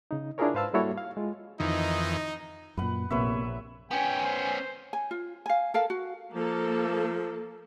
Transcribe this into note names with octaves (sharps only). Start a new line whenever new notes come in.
C#3 D#4
D4 E4 F4 G#4 A#4 C#5
G#2 B4 C5 F5 A5 E6
G3 A#3 E4 F#4 A4 C#5
F5
G#3 F4
F2 D#3 E3 D#4
F#2 A#2 B4 F#5
A#1 C3 A#3 B3 B4 C#5 E5
B3 C#4 G5 G#5
C5
G#5
F4
F5 G#5
A4 A#4 F5
F#4
F3 A#3 A4